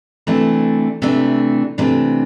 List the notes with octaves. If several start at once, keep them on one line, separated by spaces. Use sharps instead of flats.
C3 E3 A3 D4
C3 E3 A3 D4
C3 E3 A3 D4